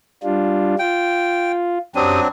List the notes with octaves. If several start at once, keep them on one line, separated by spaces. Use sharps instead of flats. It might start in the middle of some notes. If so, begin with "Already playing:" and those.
G3 D4 F4
F4 G5
F#2 F#3 C4 D4 G4 D#6